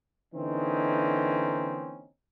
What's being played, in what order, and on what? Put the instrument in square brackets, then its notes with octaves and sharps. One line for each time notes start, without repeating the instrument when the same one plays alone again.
[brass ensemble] D3 E3 A#3 C4 C#4 D#4